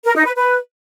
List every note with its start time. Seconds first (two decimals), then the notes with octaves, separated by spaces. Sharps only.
0.05 A#4
0.15 D#4
0.25 B4
0.35 B4